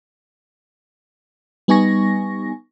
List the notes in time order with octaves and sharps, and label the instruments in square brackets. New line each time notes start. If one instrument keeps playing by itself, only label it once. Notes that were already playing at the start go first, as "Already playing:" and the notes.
[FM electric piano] G3 B3 D#4 G#5 C#6 A#6